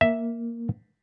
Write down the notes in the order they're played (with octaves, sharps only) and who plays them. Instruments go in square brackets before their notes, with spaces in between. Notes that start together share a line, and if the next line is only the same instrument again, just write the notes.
[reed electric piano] A#3 [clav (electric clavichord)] E5